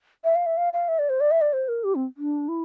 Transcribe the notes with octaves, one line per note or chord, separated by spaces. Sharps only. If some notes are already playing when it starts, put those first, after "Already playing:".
E5
F5
E5
F5
F5
E5
D5
C5
D5
E5
D5
C5
A#4
G4
C4
D4
E4